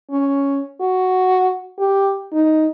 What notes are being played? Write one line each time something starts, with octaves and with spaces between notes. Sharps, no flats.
C#4
F#4
G4
D#4